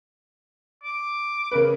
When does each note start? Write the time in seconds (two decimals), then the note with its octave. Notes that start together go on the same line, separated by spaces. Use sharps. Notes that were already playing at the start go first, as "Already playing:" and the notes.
0.83 D6
1.51 C#3 A#4 B4